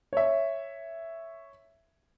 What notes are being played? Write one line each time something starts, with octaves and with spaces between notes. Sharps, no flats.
C#5 E5